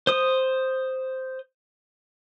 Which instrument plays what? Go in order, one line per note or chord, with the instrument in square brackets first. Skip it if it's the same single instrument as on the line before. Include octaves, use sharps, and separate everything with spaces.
[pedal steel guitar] C5 D#6